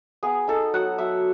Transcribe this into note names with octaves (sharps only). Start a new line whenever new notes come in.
B3 G#4
D#4 A4
F#3 F#5
F#3 E5